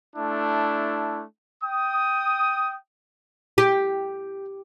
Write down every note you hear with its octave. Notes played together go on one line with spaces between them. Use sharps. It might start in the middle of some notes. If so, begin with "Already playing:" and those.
A3 D4 E4
G5 D#6
G4